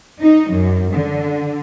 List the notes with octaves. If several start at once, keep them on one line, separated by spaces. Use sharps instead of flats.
D#4
F#2
D3